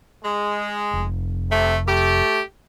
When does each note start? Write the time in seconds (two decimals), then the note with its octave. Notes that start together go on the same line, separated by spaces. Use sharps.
0.24 G#3
0.94 F1
1.51 C3 A3
1.88 A3 G4